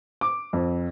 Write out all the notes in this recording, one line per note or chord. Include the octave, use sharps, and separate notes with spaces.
D6
F2